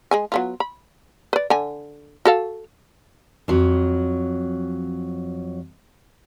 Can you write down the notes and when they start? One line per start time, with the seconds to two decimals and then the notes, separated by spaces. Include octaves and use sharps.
0.11 G#3 G#4 G#5
0.32 F#3 B3 F4
0.60 B5
1.33 B4 D5
1.50 D3 G#5
2.25 F#4 A4 F5
3.48 F2 F#3